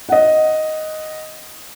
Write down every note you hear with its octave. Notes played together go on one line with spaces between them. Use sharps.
D#5 F#5